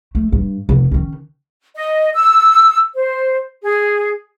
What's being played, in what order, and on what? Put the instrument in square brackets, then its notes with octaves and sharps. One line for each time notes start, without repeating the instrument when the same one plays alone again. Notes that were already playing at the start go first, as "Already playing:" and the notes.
[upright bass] A3
G2
F1
D#3 C#4
[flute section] D#5
E6
C5
G#4